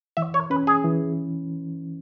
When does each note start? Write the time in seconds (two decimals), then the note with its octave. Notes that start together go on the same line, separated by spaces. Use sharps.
0.17 E3 E5
0.34 C#5
0.50 C#4 B4
0.67 G#4
0.84 E3